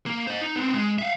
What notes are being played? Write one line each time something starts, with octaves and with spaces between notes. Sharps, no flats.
A#3 A#4
C5 D#5
D#4
B3 C4
G#3
E5 F5